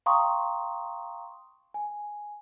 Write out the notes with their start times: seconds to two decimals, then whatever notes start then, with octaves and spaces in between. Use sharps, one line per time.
0.06 F5 G5 A#5 C6 C#6 D#6
1.74 G#5